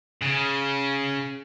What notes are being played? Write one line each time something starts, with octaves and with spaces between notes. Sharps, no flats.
C#3